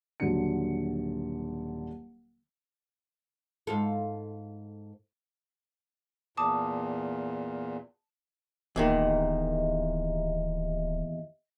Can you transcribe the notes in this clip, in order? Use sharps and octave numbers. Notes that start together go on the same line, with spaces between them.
D#1 D3 F#3 C#7
G#2 F4 A4
E2 A#2 A5 D6 D#6
D1 E2 A#2 D#3 G4 D#5 E5